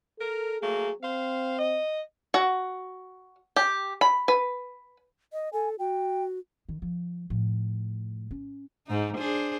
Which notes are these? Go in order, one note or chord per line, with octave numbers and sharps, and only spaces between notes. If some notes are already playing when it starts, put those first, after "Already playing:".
A4 A#4
F#3 A3 A#3 G#4
C4 C5 F5
D#5
F#4
G4
B5
B4
D#5
A4 G#5
F#4 G5
D#3
F3
A2 F3
C#4
G#2 D#4
D4 G#4 C5